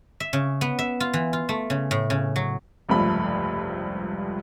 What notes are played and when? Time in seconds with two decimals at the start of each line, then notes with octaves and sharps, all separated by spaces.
0.20 E5
0.33 C#3
0.61 B3
0.79 E5
1.00 F4
1.13 E3
1.33 F4
1.49 A3
1.70 C#3
1.91 A2
2.10 C#3
2.36 F#3
2.89 F1 C#2 G2 F3 A3 B5